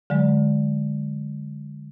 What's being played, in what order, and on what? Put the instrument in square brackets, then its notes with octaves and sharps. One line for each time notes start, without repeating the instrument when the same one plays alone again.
[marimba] D3 F#3 G#3